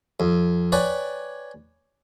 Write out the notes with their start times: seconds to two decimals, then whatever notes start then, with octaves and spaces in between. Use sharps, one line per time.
0.20 F2
0.72 B4 C#5 D5 G5 G#5